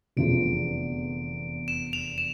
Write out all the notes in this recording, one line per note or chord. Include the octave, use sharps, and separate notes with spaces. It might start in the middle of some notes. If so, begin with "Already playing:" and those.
F1 E2 D3 F3 D7
E7
F7
E7